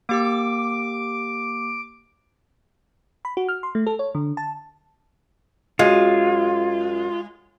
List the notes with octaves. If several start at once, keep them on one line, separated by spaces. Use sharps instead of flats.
A#3 G4 D6 E6
B5
F#4
F6
C6
A3
A4
C#5
D3
A5
F#2 G#3 F4